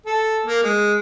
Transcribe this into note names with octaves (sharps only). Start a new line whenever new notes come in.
A4
A#3
G#3